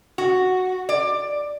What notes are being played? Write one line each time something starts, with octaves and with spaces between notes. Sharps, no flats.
F#4
D5